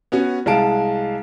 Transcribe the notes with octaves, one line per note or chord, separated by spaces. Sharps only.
B3 C#4 F#4
C2 G#3 F5 A5 D7